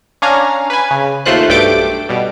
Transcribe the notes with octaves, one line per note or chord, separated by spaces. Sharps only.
C#4 D4 F5 G#5 A#5
B4 G#5
C#3
D#2 A3 F4 C5 F#6
B1 G2 A3 G5 D6 D7
B2 G3